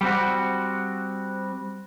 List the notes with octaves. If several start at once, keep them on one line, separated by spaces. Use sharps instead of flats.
G3 C4 F#4